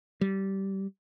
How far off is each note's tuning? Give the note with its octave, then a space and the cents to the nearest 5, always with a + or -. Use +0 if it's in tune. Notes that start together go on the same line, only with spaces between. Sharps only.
G3 -15